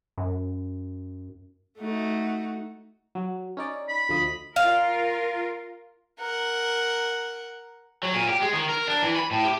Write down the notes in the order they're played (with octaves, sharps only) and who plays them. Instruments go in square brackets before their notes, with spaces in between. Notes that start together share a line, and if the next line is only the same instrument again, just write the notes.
[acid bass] F#2
[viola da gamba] A3 D#4 F#4
[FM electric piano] F#3
C#4 D#4 D5
[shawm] B5
[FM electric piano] D2 F3 D#5
[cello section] F4 A#4 [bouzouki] F5
[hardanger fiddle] A#4 F#5
[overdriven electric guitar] F#3
A#2
G4
G#3
D#3
A#4
D4
E3
B5
A2
G4